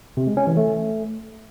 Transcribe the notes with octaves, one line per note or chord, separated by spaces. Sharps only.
C3
G#3
C#4
E3
A3